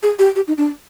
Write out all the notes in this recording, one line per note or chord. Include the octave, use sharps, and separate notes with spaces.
G#4
G4
G4
D#4
D4